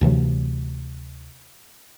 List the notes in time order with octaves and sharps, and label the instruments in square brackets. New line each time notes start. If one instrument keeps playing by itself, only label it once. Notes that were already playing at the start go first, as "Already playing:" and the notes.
[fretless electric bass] D2 C3 E3 F#3